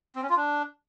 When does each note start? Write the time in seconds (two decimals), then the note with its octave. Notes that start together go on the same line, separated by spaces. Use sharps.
0.16 C4
0.22 C#4
0.29 F4
0.36 D4